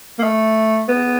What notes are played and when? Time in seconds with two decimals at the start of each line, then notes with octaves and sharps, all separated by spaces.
0.19 A#3
0.23 A3
0.88 B3